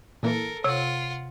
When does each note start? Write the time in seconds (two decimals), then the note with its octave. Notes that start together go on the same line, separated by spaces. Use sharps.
0.23 A#2 E3 A#3 A4 A#4
0.64 C3 F4 C#5 F#5